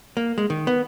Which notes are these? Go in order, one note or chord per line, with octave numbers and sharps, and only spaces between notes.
A#3
G#3
D#3
B3